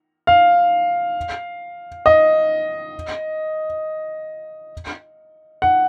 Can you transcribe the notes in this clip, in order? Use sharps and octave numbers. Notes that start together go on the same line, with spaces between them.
F5
D#5
F#5